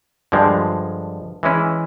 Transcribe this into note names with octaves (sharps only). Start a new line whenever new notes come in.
G2 D3 F3 G#3
E3 G#3 C#4 E4